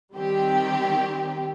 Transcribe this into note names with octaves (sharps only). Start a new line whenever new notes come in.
D#3 G3 C4 G4